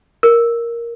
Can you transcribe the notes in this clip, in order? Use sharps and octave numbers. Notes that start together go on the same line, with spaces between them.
A#4